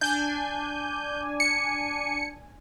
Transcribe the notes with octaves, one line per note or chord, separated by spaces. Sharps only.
D4 G#5 G6
C#7